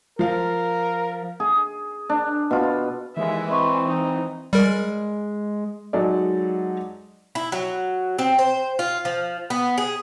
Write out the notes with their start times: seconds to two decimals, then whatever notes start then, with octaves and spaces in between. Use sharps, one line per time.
0.19 F3 A#4 F5
1.40 G#4
2.09 D4
2.51 B2 F4
3.17 D#2 E3 G#3 E5
3.50 C4 B4 D#5 C6 C#6
3.88 D#4 D#5
4.53 G3 G#3 A#4
5.93 F#3 G#3 D#4 A4 D5
7.35 E4
7.52 F#3
8.18 C4
8.39 C5
8.79 F4
9.05 F3
9.50 B3
9.78 G#4